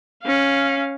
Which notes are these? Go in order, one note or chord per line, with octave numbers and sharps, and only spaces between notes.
C#4 F5